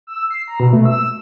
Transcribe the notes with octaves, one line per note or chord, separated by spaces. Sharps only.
E6
C7
A#5
B2
A3
E6